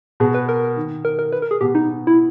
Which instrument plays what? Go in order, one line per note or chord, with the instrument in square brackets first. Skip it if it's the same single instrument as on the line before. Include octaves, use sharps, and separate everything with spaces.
[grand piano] B2 [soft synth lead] G#4
[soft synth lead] B4
A#4
[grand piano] D#3
[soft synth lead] A#4
A#4
B4
A#4
G#4
[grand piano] B2 [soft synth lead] G4
[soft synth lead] D#4
E4